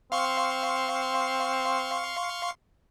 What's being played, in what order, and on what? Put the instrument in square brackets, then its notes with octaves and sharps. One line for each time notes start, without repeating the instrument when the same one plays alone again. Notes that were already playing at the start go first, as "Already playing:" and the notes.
[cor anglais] C4 [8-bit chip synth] F5 C6 C#6